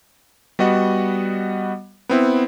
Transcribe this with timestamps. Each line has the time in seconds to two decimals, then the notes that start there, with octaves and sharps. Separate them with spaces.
0.59 G3 B3 F#4 D#5 F#5
2.09 B3 C4 E4